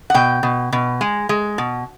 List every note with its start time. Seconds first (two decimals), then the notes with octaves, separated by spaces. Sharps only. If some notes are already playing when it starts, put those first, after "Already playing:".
0.10 F#5
0.14 B2 G5
0.43 B2
0.72 B2
1.01 G#3
1.29 G#3
1.58 B2